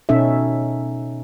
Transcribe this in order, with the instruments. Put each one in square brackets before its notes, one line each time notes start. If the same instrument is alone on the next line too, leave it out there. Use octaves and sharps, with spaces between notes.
[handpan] B2 C#4 D#4 A4 E5